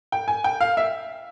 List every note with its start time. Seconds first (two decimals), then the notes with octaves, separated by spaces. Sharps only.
0.12 G5
0.28 G#5
0.44 G5
0.61 F5
0.77 E5